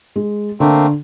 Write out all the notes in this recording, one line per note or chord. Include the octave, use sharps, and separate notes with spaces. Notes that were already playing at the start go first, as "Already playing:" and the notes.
G#3
D3 A3 A#3 C4